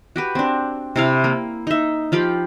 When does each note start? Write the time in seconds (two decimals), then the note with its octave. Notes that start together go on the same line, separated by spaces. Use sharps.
0.16 F#4 G4 B4
0.35 C4 D4
0.96 C3 E4 F5
1.24 A#3
1.67 D#4 E5
2.12 F3 F4 G4 B5